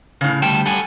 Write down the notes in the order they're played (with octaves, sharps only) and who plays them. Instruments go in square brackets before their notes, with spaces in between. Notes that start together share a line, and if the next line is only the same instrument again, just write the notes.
[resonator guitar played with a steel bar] A2 C#3
[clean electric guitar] D2 G5 A5 [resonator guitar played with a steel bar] G3
[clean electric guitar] A4 F#5 G#5